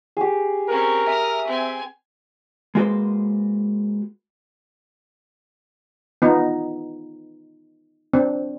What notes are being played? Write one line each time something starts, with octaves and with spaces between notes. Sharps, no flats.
G4 G#4
C4 C#4 A#4
E5 D#6 F6
C4 G#5
G#3 A#3 F#4 B4 C5
B3 D#4 F4
C4 D4